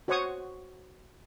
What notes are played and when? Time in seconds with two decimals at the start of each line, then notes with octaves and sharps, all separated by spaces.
0.08 F#4 C5 C#5 F#5 C#6 D#6